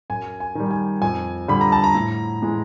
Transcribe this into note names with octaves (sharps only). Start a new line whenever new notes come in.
F#2 G#5
G#5
D#3 G3
G#5
F2 G#5
D3 G3 B5
A#5
A5
A#5
A2
E3 G#3